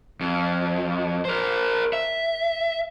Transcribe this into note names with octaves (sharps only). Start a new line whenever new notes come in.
F2
A#4 C5
E5